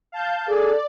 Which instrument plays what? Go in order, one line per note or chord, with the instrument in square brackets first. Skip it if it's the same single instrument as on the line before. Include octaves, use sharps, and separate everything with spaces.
[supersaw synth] F5 A5 G6
[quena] G#4 [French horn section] A4 [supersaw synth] D5